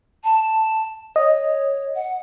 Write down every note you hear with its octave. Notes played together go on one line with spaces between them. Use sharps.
A5
C#5 D#5
F#5